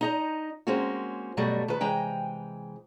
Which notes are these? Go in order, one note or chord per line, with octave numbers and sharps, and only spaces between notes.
D#4 D#5 A#5
G#3 A#3 C4 C#4 F#4
G2 B2 F#3 G3 A3
D#3 B4
C3 E3 G#3 G5 A#5